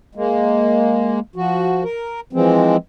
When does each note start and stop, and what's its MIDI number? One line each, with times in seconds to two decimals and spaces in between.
0.15 1.20 56
0.15 1.20 58
1.36 1.84 53
1.36 1.84 66
1.84 2.20 70
2.33 2.77 52
2.33 2.77 53
2.33 2.77 56
2.33 2.77 60